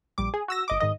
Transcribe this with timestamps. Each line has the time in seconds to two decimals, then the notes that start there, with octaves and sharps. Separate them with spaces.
0.18 A#1 G3 D6
0.34 G#4
0.48 F#4 E6 A#6
0.68 G1 D#5 D6
0.80 G#2 D#3 D#5